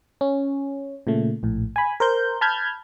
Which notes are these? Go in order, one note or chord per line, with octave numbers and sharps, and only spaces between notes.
C#4
A#2 C#3 A3
A#1 A2
G#5 B5
A#4 C5 G6
A5 B5 F6 G6 G#6